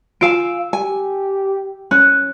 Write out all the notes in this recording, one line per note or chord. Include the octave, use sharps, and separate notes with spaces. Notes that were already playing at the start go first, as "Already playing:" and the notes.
F4 F5 G#5 E6 D7
G4 G#5
C#4 F#6